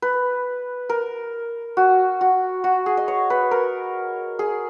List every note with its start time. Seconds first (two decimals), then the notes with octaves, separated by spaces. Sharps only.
0.02 B4
0.89 A#4
1.77 F#4
2.21 F#4
2.64 F#4
2.86 G#4
2.97 D#5
3.08 C#5
3.30 B4
3.51 A#4
4.39 G#4